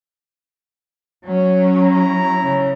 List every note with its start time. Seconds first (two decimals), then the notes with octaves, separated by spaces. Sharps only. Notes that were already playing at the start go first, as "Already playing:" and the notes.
1.26 F#3 C#4
1.81 E4 A#5
2.44 C#3